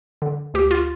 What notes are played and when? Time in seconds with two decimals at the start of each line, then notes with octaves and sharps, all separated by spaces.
0.22 D3
0.54 D2 G4
0.71 F4